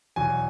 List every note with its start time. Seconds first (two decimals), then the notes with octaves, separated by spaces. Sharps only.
0.16 E2 B2 F#3 G#5